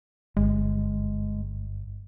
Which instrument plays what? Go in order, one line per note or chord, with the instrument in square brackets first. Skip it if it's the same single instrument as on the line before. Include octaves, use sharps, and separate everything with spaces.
[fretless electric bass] G1 [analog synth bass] G#3